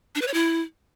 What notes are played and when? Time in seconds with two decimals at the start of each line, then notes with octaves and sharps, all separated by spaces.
0.15 D4
0.21 B4
0.28 C#5
0.34 E4